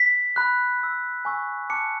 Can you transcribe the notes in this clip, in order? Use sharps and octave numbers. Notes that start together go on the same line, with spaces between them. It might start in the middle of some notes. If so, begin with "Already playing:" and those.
Already playing: B6
B5 F#6
B5 E6
G#5 C#6 E6
A5 D6 F#6 C#7